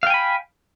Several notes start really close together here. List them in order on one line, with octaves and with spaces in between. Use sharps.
F5 G5 G#5 B5